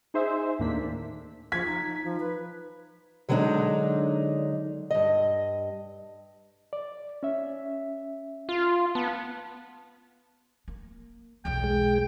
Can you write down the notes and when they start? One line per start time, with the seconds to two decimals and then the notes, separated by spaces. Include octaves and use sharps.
0.14 D#4 G#4 C5 E5
0.59 D#2 A2 A#3 D4 B6
1.52 F3 G#6 B6
1.66 D#4
2.04 F3
2.20 B4
3.29 D3 F#3 G#3 B3 D4 D#4
4.91 G2 D#5
6.73 D5
7.23 C#4 E5
8.49 F4
8.95 B3 A5
10.68 A#3
11.45 B1 E2 G5
11.64 G#3 G#4